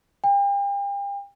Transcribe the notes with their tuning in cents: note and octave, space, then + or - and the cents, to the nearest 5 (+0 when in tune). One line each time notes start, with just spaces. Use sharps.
G5 +40